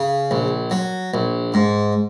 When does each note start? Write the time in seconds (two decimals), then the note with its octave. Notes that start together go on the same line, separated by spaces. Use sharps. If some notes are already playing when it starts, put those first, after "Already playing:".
Already playing: C#3
0.31 A#1
0.71 F#3
1.14 A#1
1.54 G#2